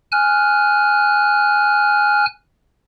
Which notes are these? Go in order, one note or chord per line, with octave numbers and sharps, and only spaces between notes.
G#5 F6 F#6